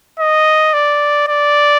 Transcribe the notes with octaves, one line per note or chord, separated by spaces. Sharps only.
D#5
D5
D5